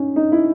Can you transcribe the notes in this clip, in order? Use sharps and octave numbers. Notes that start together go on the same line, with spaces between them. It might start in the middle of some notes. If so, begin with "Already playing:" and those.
Already playing: C#4 D#4
D#4
E4